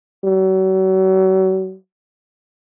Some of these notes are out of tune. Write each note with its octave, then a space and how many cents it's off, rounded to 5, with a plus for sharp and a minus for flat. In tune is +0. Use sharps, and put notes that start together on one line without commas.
F#3 +35